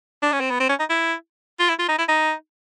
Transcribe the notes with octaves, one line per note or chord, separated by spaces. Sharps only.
D4
C#4
C4
B3
C4
C#4
D#4
E4
F4
E4
F4
D#4
E4
D#4